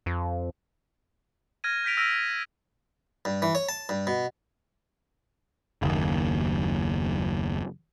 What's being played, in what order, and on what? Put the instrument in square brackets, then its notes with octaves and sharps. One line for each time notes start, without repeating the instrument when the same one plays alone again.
[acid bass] F2
[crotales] F6 G#6 A#6 D#7
G6 A#6 B6 D7 F7
E6 F6 A#6 B6 D7 D#7
[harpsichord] G2
E3
C#5
A5
G2
B2
[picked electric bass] F#1 D#2